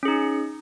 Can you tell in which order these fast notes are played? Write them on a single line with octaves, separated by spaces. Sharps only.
C#4 G#4 D#4